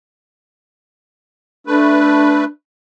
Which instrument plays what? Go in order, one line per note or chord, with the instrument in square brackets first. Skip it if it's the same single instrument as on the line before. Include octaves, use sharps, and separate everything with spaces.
[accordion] A3 B4 [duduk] D4